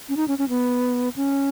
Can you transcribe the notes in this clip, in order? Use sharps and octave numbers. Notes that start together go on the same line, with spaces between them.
C#4
D#4
C#4
C#4
B3
C#4